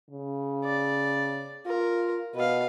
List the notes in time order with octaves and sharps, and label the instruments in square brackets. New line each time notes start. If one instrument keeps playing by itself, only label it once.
[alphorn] C#3
[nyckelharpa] D5
[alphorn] F4 [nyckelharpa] A#4
[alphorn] B2 [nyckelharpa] B4 F5